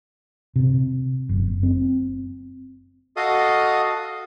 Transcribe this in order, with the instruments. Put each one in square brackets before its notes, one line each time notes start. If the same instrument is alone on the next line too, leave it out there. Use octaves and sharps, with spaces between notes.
[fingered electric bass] C3
F#1
C4
[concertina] F#4 A4 D#5 F5 D#6